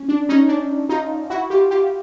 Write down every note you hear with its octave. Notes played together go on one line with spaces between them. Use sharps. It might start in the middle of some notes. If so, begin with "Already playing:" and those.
Already playing: C#4
D4
C#4 D#4
D4
D#4 F4
E4 F#4
F4 G4
F4 G4